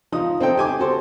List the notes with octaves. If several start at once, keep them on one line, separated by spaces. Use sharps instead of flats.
F3 D#4 D#6
C4 D#4 A4 G5
G4 G#5 D6
F#4 A4 C5